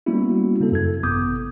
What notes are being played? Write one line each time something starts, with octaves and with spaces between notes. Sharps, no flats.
G3 A#3 B3 C#4 E4 F#4
C#3 A#3 C4 A4
F#2 A4 G#6
G#1 C3 B3 D6 D#6 G6